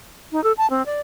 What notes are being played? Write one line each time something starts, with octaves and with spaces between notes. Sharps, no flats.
D#4
A4
A5
C4
D5